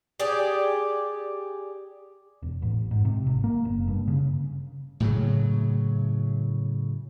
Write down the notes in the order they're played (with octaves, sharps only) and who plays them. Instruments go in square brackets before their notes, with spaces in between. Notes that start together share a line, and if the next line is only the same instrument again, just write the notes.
[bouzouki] G4 G#4 D5
[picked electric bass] E1
A1
G#2
C3
G#1
A#3
F#1
G2
C#3
[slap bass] A2 C#3 F#3